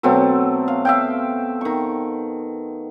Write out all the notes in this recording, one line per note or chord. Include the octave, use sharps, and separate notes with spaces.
B2 F#3 A3 C4
F5
E5 F5 G5
D#3 C#6